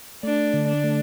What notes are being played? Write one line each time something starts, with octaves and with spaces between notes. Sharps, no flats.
A3 D4
D3
D4
A3